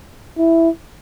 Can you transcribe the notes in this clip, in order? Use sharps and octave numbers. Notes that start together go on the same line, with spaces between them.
E4